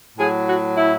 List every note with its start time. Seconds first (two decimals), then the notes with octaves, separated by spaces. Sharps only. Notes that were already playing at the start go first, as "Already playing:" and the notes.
0.18 A2 F#3 G#4
0.46 F#4
0.75 E4